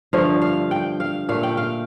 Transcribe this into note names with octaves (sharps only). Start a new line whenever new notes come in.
G2 D3 F3 A3 F5
F5
G5
F5
A#2 A3 F5
G5
F5